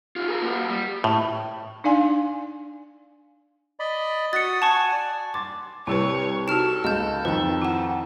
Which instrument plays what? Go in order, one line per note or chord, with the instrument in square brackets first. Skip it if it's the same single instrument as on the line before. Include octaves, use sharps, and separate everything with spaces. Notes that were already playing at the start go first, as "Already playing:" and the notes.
[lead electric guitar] F4 G4
G#4 A#4
A#3 F#4
G3
[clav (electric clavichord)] A2
[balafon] D4 D#4 D5 F5 G#5
[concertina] D5 D#5 B5
[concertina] F#4 D#6 [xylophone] A6 C#7
[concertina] F#5 G#5 [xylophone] A5 C#6
[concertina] D5
[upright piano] C6 A6 [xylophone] D6
[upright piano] C2 [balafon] E4 G4 B4 [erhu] C#5
[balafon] D#4 F#4 [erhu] A4 [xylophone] A5 F6 E7
[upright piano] C#2 E7 [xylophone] D#5 G6
[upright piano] F2 D#3 [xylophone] B4 A5
[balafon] E4 F#5